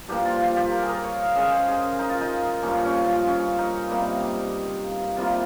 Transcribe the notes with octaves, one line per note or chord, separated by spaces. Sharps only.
G2 F3 A#3 G4
F4
F4
G4
A#4
G#4
A#4
C#5
F5
C#3 G#3 D#5
C5
G#4
D#4
F4
D#4
G2 F3 A#3 C#4
C#4
F4
C#4
D#4
C3 G3 A#3
C3 G3 A#3 F4